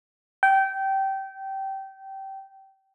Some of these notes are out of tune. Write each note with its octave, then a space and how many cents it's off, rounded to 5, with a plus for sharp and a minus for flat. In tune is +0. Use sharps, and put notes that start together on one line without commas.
G5 -20